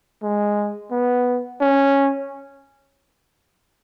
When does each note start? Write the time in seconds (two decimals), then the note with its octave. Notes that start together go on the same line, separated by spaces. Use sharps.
0.23 G#3
0.91 B3
1.61 C#4